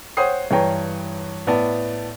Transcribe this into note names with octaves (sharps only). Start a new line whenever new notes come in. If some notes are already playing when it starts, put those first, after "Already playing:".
C5 C#5 F#5 G5 D#6 C7
G2 E3 B4 C#5 G5 A#5
A2 B3 D5 A5